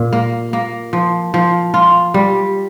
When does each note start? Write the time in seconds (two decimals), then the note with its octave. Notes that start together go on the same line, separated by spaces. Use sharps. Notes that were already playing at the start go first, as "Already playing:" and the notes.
Already playing: A#2
0.13 A#3
0.53 A#3
0.93 F3
1.34 F3
1.74 F4
2.14 G3